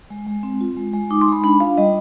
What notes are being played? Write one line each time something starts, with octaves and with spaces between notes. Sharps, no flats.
G#3
G#3
C4
F4
G#3
G#3
D#4 D6
C6
G#3 B5
D4 B5
F4 F5
G3 D#5